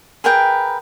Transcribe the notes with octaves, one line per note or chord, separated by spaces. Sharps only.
G#4 A#4 B4 G5